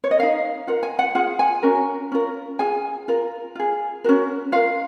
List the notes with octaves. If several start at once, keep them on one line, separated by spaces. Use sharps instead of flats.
C#5
D#5
D#4 A#4 F5
F4 A#4 F#5
G#5
F#5
F4 G#4 F#5
G#5
C#4 F#4 A#4
C#4 F4 A#4
F4 G#4 G#5
F4 A#4
F4 G#4
C#4 F#4 A#4
F4 A#4 F5